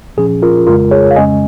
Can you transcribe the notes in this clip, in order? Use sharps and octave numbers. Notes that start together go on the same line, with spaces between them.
A#2 F3 C#4 G#4
F4 A#4
F2 C#3 G#3 F4 A#4
G#4 C#5
F5
F2 C#3 G#3 C#4 D#5 G#5